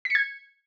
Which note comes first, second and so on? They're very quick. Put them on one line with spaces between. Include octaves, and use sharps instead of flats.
B6 C#7 G#6